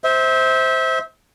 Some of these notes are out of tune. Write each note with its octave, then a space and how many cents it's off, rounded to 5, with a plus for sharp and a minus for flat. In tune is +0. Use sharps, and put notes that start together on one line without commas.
C5 +0 E5 -30